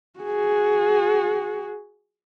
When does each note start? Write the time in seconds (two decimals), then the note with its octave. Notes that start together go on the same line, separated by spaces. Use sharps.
0.20 F#4 G#4